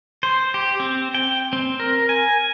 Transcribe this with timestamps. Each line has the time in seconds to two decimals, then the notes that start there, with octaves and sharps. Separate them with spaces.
0.23 C5
0.54 G4
0.80 C4
1.15 G5
1.53 C4
1.80 A#4
2.09 G#5